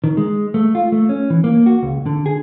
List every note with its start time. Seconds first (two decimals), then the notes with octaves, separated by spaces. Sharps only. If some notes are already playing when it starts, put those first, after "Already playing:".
0.04 D#3
0.17 G#3
0.54 A3
0.75 F4
0.92 A3
1.09 C#4
1.30 E3
1.44 A#3
1.66 F#4
1.82 C#2
2.06 D3
2.26 G#4